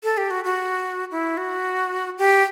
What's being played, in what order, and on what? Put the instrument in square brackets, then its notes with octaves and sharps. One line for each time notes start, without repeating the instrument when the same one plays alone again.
[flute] A4
G4
F#4
F#4
E4
F#4
G4